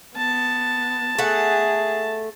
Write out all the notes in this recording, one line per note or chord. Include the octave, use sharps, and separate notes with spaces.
B3 A5
A3 G#4 F#5